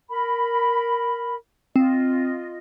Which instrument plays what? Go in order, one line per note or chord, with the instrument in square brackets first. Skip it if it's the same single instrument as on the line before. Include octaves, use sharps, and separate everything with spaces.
[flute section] A#4 B5
[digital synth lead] C4 [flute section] F4 D#5